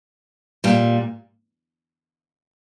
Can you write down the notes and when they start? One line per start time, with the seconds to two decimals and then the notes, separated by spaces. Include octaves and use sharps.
0.64 A#2 G3